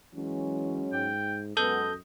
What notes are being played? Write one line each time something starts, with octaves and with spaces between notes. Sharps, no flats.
E3 F#3 G#3 C#4
G#2 G5
F#2 G#3 B3 A4 D#5 G6